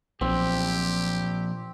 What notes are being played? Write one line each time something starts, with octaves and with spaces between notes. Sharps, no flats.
B1 A#2 F3 C4 G4